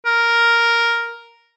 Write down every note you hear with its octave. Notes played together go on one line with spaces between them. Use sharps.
A#4